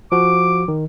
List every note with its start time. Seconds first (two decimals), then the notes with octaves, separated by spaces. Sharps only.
0.12 F3 F#4 D6
0.68 D#3